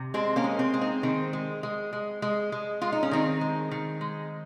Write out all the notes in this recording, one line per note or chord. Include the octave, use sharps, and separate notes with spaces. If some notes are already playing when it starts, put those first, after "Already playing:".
Already playing: C3
G#3 C4
A#3 C#4
G#3
C4
G#3
C4 D#4
D#3 C4
G#3
G#3
G#3
G#3
G#3
G#3 F4
D#4
C#4
D#3 C4 D#4
G#3
D#3
G#3